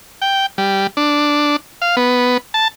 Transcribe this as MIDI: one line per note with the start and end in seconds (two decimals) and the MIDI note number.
0.22 0.46 79
0.58 0.87 55
0.97 1.56 62
1.82 1.96 77
1.97 2.37 59
2.54 2.68 81